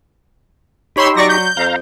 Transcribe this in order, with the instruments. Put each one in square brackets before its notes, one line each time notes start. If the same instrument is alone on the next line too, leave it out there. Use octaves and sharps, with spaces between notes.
[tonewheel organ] D#4 G4 [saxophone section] C#5 [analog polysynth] B5 C6 E6
[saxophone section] F#3 [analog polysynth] D5 C#6 A#6
[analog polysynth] G6
[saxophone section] F2 [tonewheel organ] F5 A#5